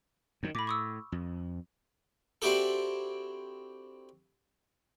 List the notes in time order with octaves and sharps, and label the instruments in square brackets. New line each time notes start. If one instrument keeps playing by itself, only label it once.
[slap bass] F#2 D#3
[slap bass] A2 [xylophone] B5 D6
[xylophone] C#6 D#6 E6
[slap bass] F2
[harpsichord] C4 D4 E4 F#4 G4 A4